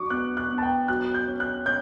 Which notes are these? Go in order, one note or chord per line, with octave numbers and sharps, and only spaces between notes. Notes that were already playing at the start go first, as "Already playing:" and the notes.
Already playing: F#3 D4 C#6 D6
B3 F#6
F#6
B3
A5
G5
F#3 F#6
G6
C#4
F#6
C#4 G6